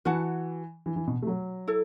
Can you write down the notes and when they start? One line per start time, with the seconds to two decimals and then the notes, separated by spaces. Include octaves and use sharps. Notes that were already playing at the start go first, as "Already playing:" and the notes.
0.05 E3 F#4 B4 F#5 A5
0.86 E3
0.96 E3
1.07 B2
1.22 A3
1.27 F#3
1.68 E4 A4